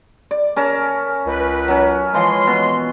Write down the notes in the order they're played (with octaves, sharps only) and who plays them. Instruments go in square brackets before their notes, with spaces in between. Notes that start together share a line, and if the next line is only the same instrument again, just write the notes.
[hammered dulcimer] D5
C#4 A#4 A5
[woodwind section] C#2 B4
[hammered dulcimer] F#3 C#4
[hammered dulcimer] E3 F3 [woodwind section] G#3 C#5 C6
[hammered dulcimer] B2